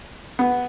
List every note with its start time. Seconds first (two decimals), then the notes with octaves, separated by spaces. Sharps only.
0.39 B3